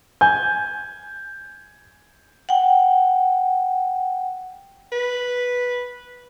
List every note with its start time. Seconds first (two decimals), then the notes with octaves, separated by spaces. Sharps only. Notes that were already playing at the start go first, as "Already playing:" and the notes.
0.21 G#5 G6
2.49 F#5 G5
4.92 B4